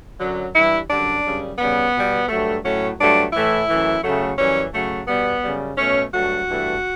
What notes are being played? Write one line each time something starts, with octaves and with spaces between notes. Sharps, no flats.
F#2 D3 F#3
G2 E3 G3 E4
F#2 D3 G3 D4
F#2 C#3 G3
C#3 G3 B3
B2 G3
G2 F#3 A3
A2 F#3 A3 C#4
G2 F#3 A3 D4
A2 E3 A3 E4
F#2 E3 A3
C#3 F#3 A3
F#2 E3 G3 C#4
C#3 F#3 A3
B2 G3 B3
F#2 C#3 G3
B2 A3 C#4
G2 F#3 A3 F#4
G2 E3 A3